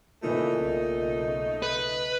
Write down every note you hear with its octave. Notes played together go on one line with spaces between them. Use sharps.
A#2 C#3 E3 A3 D#4
B1 C#3
B4